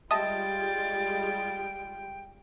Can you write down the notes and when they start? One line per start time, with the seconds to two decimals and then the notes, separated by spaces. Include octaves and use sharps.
0.11 G3 G#3 F4 D#5 E5 G5 A5 A6